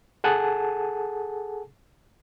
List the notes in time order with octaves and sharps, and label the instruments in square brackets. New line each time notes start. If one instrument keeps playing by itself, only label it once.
[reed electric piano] G#4 A4 F#5 G#5 A5